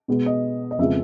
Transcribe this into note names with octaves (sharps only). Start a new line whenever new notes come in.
B2 G#3 B3
D#5
D#5
F2 C#3 F3 G#3 B3 E5